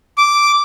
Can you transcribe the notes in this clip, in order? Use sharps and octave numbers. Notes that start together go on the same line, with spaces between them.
D6